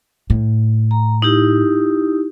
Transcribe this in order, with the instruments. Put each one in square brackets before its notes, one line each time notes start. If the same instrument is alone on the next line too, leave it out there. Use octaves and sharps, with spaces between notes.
[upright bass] A2
[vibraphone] A#5
D#4 E4 G4